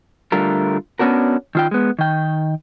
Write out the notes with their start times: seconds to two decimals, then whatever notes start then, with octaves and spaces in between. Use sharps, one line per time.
0.32 D3 G3 A3 F4 A#4
0.99 B3 C#4 D4 F#4 A#4
1.55 D#3 F4 G5
1.71 G#3 B3
1.99 D#3 G5